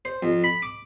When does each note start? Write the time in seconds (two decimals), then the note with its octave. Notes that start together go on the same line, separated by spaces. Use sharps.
0.05 C5
0.23 F2
0.44 B5
0.62 D6